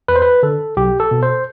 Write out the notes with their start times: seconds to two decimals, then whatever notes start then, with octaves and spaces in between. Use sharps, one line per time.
0.08 E2 B4
0.16 C5
0.22 B4
0.43 D3 A4
0.77 B1 G4
1.00 A4
1.11 B2
1.23 C5